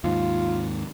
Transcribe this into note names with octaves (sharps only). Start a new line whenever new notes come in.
D#2 G#2 F4